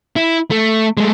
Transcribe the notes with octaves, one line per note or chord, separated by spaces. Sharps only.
E4
A3
G#3 A3